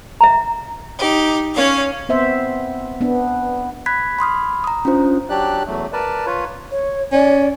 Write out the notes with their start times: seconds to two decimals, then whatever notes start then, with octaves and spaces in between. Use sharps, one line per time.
0.21 E5 A#5
0.98 D#4 G4
1.55 C#4 C#5 F5
2.09 B3 C4 C5 E5
3.01 B3 D4
3.86 B5 F#6 G#6 B6
4.19 B5 C6 D#6 F6
4.64 A#5 D#6
4.85 C#4 D4 F4 C5
5.29 F#3 D4 G4 D5 F#6
5.67 E2 F#3 A3
5.93 A#4 B4 D5 A5
6.26 F4 B4 C#5
6.71 C#5
7.12 C#4 D5